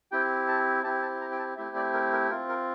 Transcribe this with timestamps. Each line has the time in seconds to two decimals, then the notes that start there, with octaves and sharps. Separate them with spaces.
0.12 C4 E4 G4 G5
0.48 A5
0.84 C4 E4 G4 A5
1.02 A5
1.21 A#5
1.32 G5
1.39 A5
1.57 A3 C4 E4 G4 E5
1.76 D5
1.94 A#4
2.12 A#4
2.30 C4 F4 A#4
2.49 A#4